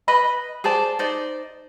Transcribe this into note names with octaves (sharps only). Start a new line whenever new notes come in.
B4 D#5 B5
G#4 C5 D5 A5
D#4 C5 D5